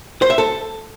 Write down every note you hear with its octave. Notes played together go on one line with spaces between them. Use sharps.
C5
E5
A4